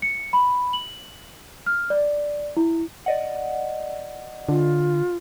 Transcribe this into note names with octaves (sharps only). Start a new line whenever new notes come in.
C#7
B5
F#7
F6
D5
E4
D5 D#5 F#5
D3 F4